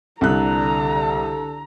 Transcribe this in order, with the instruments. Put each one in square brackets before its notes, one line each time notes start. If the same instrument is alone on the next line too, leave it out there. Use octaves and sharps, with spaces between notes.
[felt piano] C2 F#6 [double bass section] D3 [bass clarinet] A4 [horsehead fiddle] A#5